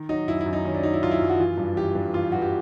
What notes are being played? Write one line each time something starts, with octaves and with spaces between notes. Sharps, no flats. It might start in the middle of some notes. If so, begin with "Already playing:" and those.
Already playing: D#3
F#3 D#4
F#2 E4
E4
F#2
D#4
D#3 C#4
D4
F#3 D#4
E4
F#2 F4
E4
F#2
F#4
E3 F4
G2
E3 G4
G2
E3 F4
G2 F#4
G4